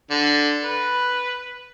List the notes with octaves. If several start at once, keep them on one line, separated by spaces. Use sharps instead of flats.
D3
B4